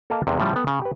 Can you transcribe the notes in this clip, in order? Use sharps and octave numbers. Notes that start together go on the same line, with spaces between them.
A#3 A4 A#4 D#5 F5 A5
E2 C3 D#3 G#3
A2 C#3 F3 G3
B3 A4 G5
C#3
G4 B4